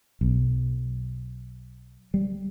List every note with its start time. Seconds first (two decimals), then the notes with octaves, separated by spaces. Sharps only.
0.21 B1
2.14 G3